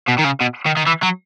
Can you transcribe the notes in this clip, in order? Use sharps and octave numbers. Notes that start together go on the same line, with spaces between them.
B2
D#3
C#3
B2
D#3
D#3
E3
F#3